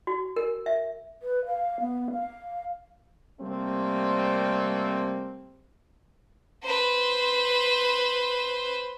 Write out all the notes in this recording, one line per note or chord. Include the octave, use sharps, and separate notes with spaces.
F#4
A#4
E5
B4
F5
B3
F5
C3 G3 A3 A#3 C4
B4 C5